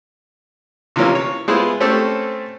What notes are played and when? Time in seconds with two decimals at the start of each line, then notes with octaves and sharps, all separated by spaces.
0.96 C3 E3 F3 A#3 C#4
1.15 C#5
1.48 G#3 B3 E4 F4 G#4 C5
1.80 A3 C4 C#4 G4 A4